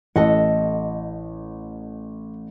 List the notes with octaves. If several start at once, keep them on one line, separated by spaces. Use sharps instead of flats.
A1 A4 D#5 F#5